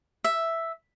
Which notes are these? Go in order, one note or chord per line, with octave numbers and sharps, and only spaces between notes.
E5